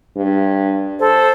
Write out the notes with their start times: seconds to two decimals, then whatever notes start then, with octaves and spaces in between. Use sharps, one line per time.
0.17 G2
0.99 A4 C5